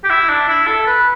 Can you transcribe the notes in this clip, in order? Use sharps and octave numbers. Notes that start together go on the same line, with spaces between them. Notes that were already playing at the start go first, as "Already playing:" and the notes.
G4
E4
D4
E4
A4
B4